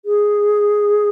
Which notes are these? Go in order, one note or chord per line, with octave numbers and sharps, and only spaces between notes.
G#4